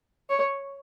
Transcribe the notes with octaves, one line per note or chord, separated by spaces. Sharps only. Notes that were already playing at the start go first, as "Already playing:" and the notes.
C#5